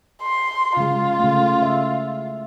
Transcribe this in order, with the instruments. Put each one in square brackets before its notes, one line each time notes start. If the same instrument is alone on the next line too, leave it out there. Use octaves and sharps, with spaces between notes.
[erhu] C6
[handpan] C#3 G#3 [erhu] F4
[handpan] C#3 A3
E5